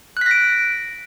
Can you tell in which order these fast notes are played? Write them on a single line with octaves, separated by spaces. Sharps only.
F#6 B6 A#6 D7